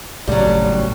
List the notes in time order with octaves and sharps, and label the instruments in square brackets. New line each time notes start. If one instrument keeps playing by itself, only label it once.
[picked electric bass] G#1 C#2 A2 [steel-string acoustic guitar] F#3 G3